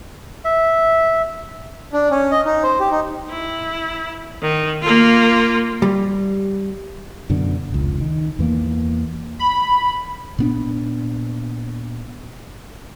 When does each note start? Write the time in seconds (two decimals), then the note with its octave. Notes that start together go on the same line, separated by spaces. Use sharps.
0.45 E5
1.93 D4
2.11 C#4
2.31 D#5
2.45 D#4
2.63 C5
2.80 G4
2.92 D#4
3.30 E4
4.42 D#3
4.82 A#3 F4
5.82 G3
7.30 F#2 B2 D3
7.70 F1 C#2
8.01 D#3
8.39 E2 E3 A#3
9.39 B5
10.39 A#2 B3 D4